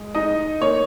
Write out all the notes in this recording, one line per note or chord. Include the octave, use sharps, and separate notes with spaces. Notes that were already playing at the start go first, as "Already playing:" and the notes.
Already playing: G#3
D#4 D#5
A#3 C#5